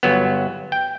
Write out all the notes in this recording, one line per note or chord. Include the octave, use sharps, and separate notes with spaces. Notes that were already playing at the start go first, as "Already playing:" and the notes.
G1 F#3 B3
G5